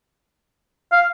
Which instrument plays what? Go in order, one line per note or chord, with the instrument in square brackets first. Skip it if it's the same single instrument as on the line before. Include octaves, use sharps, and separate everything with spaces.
[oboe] F5